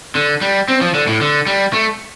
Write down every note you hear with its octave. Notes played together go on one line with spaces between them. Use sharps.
D3
G3
C4
F3
D3
A2
D3
G3
A3